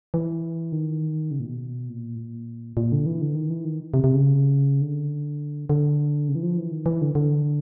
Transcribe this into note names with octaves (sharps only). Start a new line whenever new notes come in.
E3
D#3
C#3
A#2
B2
A#2
A2
A#2
A#2
D3
E3
D3
D#3
E3
D#3
C3
C3
C#3
D3
D3
C#3
E3
F3
E3
D#3
E3
D3
D3